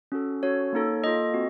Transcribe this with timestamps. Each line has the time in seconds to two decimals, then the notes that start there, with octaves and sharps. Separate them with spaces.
0.12 C#4 F#4 A4
0.43 C#4 F#4 A4 C#5
0.73 A#3 D#4 A4
1.04 A#3 F4 A4 D#5
1.34 C4 F#4